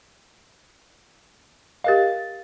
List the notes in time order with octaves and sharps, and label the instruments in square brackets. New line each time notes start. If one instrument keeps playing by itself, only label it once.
[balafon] G4 A#4 D#5 [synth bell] F5 A6